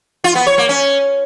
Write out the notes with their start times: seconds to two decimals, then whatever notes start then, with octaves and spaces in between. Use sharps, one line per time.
0.24 F4
0.35 B3
0.47 C#5
0.58 A#3
0.69 C#4